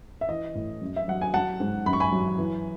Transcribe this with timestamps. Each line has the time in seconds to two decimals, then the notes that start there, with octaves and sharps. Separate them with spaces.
0.21 E5
0.29 E3 D#5
0.55 A2
0.82 F#2
0.96 E5
1.08 F#3 F#5
1.21 G#5
1.34 F#3 F#5 A5
1.60 G#2
1.86 F#2 B5
1.93 C#6
2.00 G#5 B5
2.12 F#3
2.38 E3